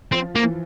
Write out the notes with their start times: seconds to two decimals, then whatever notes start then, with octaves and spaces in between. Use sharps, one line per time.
0.12 F3 C4
0.35 A#3
0.43 E3